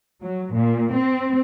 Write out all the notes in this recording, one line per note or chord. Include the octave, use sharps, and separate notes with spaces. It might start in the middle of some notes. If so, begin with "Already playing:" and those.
F#3
A#2
C4